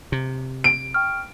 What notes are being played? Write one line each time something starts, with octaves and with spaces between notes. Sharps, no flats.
C3
D7
G5 C#6 F6